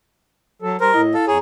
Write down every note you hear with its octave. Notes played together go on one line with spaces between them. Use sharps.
F#3 A4
G3 A#4 C5
A2 E4 D#5
A4 F5
F2 G#4 C#5 A#5